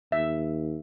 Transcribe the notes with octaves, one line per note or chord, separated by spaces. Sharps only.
D#2 E5